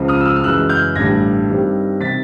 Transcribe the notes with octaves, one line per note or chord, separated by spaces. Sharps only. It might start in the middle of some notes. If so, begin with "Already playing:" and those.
Already playing: C#2 C#3 F3
D#6 F6
E6
D#6 F6
F6
F#2 C#3 E3 G#3 E6 F#6
F6 G6
A1 G2 D3 G3 G#6 A#6
G2 D#3 G3 C4
C3 D#3 A6 B6